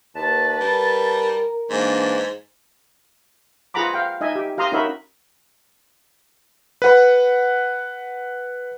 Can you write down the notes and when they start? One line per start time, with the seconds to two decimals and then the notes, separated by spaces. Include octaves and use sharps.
0.15 D#2 B4 A5
0.61 G3 A#4
1.70 G#2 E3 A#3 D4
3.74 F4 G#4 F#5 A#5 B5 D6
3.94 F5 G5
4.21 D#4 D#5 E5 G#5
4.35 G4
4.58 G4 F5 A#5 C6 D#6
4.72 C#4 D#4 F#4 A#4 E5 B5
6.82 B4 F#5 B5